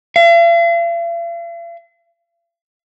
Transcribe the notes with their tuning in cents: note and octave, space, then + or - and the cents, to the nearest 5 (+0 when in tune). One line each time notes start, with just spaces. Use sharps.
F5 -45